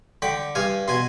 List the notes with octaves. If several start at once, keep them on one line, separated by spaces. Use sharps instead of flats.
D3 G5 B5
G2 F5 G#5
B2 G#5 C6